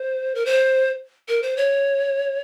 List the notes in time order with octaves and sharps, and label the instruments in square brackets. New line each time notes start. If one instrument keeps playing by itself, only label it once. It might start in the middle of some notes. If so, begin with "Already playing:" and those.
Already playing: [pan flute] C5
A#4
C5
A#4
C5
C#5